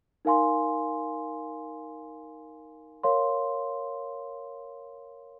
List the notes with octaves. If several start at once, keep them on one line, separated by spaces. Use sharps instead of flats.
D#4 A#4 F5 G#5 C6
A#4 C#5 F5 C6